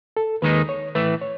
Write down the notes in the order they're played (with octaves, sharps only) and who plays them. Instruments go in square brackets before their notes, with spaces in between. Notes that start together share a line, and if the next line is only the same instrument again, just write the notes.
[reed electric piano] A4
[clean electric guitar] D#2 D#3 G#3 D#4 [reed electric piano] B4
[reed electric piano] C#5
[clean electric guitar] A2 E3 A3 [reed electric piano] B4
[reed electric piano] C#5